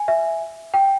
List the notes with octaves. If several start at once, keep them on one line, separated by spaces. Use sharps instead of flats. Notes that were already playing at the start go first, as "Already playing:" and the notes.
Already playing: G#5
E5
G5